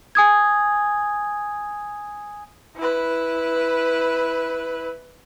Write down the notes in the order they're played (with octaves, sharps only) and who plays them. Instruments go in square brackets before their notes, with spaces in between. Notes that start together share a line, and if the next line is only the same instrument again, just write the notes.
[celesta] G#5 D#6 G#6
[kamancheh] E4 B4